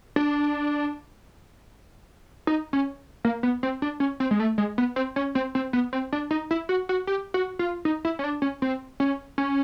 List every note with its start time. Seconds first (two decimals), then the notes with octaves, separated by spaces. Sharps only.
0.16 D4
2.47 D#4
2.73 C#4
3.25 A#3
3.43 B3
3.63 C4
3.82 D4
4.00 C#4
4.20 C4
4.31 G#3
4.40 A3
4.58 G#3
4.78 B3
4.96 C4
5.16 C#4
5.35 C4
5.55 C4
5.73 B3
5.93 C4
6.13 D4
6.31 D#4
6.51 E4
6.69 F#4
6.89 F#4
7.07 G4
7.34 F#4
7.59 F4
7.85 D#4
8.05 E4
8.19 C#4
8.24 D4
8.42 C#4
8.62 C4
9.00 C#4
9.38 C#4